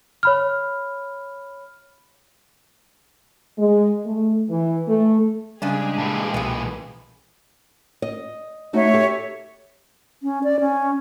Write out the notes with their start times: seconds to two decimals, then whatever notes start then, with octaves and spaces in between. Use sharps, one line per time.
0.23 C#5 B5 F6
3.59 G#3
4.05 A3
4.51 E3
4.89 A3
5.62 G#2 C#3 G3 G#3 D4 G4 G#4
5.98 A#2 E3 A5
6.34 C2 B2 F3 B3
8.02 D#5
8.73 A3 D#4 F#4 C#5 E5
8.94 G4 A4
10.23 C#4
10.44 D5
10.60 C#4